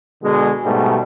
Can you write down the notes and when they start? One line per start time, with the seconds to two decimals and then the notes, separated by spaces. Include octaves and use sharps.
0.23 B2 D3 G#3
0.64 G#2 B2 G3 A3